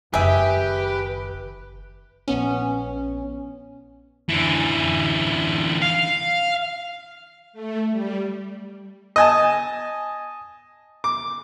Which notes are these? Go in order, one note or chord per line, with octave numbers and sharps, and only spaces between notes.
F#1 D#3 G4 G#4 B4 E5
A#1 B3 C#4
D3 E3
F5
A3
G3
D#5 G#5 A5
D6